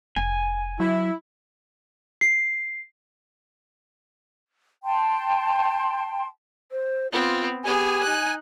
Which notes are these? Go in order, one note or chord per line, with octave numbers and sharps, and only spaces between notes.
F1 G#5
F#3 E4
C7
G5 A5 C6
C5
B3 C4 F4
B3 G4 G#4 G#5
D#4 F#6